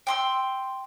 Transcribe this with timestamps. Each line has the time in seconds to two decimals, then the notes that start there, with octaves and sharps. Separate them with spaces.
0.07 G5 C6 E6